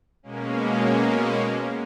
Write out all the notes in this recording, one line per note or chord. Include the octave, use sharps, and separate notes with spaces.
B2 G#3 A#3 C#4